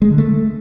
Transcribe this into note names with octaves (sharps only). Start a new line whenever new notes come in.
G#3
D3
A3